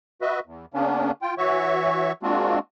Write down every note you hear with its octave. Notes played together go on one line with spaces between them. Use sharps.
F#4 B4 D#5 E5
E2
C#3 A#3 B3 C#4 D4
F4 G5
E3 F#4 C#5 E5 C#6
G#3 A#3 C4 D4 F4 F#4